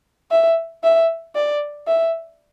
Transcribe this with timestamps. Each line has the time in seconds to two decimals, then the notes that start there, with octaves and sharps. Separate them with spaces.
0.31 E5
0.84 E5
1.35 D5
1.87 E5